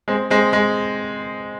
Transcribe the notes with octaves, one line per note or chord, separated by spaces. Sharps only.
G#3 C4
G#3 C4
G#3